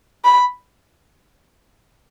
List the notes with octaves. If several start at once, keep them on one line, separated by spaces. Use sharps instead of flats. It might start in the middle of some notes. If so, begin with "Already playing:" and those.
B5